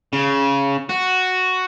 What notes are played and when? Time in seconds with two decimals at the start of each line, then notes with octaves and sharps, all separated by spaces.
0.13 C#3
0.90 F#4